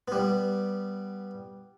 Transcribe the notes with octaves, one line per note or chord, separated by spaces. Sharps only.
G3 B3